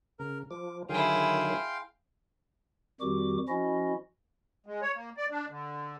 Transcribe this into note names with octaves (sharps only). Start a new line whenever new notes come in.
C#3 A#4
F3 D6
D3 D#3 F#3 E4 G#4 F5 G5 C6
F2 D#3 G3 F#4 G4 D6
F3 C#4 E4 F#4 D#5
G#3
C#5
A#3
D5
D4
D3